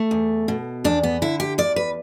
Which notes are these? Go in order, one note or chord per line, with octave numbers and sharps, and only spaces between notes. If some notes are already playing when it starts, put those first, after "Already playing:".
Already playing: A3
E2
B2
E2 D4
B3
D3 E4
G4
E2 D5
B4